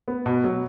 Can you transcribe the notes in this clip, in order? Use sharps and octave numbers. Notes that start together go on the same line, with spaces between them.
B3
B2
F#3